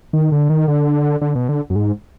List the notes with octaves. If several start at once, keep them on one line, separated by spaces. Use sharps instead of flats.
D#3
D3
D#3
D3
D3
B2
D3
F#2
G#2